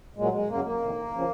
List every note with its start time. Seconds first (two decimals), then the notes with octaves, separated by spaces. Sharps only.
0.16 A#2 F#3 G#3
0.32 G#3
0.48 F#2 C#3 F#3 A#3
0.64 A#3
0.80 F2 C3 D#3
1.13 C#3 F3